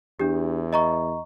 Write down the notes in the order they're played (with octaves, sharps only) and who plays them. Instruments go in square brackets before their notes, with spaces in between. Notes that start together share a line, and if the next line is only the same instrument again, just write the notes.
[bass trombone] E2 [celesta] D4 G4
[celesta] D#5 A#5 C#6